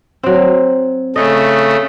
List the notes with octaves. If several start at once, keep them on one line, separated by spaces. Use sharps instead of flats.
F#3 C4
C#3 A3 D#5